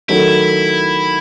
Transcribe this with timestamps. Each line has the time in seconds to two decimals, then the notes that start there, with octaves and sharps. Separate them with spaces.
0.09 D#3 F#3 A3 E4